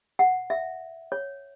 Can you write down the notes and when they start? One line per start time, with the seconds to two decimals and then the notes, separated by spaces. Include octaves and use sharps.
0.19 F#5
0.50 E5
1.12 C#5